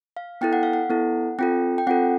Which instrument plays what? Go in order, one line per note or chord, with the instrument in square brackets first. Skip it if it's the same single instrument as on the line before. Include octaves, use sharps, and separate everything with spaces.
[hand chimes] F5
B3 E4 A4 G5
F#5
F5
F#5
B3 E4 A4
C4 F4 A4 G5
G5
C4 F4 A4 F#5